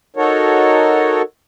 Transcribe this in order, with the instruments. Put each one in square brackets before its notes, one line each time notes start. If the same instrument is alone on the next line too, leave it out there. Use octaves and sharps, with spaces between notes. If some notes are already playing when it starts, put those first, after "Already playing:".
[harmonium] D#4 F#4 A4 A#4 C#5